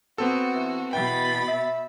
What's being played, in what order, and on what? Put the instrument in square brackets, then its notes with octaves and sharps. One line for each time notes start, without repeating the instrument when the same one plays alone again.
[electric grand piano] B3 C4 A4 [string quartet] F#4
[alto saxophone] E3
[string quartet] B2 B5 A6 [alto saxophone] E3 [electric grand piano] G5
[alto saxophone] E5